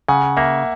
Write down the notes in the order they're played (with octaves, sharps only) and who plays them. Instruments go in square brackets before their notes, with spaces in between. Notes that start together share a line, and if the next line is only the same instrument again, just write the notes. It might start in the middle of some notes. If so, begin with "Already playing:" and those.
[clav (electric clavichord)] C#3 [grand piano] F#5 G#5
[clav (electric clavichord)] A#3 [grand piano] E5 F#5